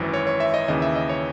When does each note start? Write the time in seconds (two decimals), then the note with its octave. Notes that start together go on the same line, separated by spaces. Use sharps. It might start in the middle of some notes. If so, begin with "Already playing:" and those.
Already playing: G#1 F#2 E3
0.14 C#5
0.27 C#5
0.40 E5
0.54 D#5
0.68 D#2 C#3 E3 D#5
0.82 E5
0.95 D#5
1.09 C#5